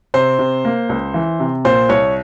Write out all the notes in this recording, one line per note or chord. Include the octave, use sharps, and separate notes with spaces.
C3 C5
C3
A#3
C#2
E3
C3
A#2 C5
C2 C#5